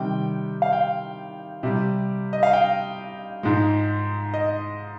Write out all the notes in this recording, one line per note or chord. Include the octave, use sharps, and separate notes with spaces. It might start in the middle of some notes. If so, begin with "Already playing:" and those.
Already playing: C3 D#3 G3 G5
F5
G5
C3 G3
D#5
F5
G5
G#2 F3 G#3
D#5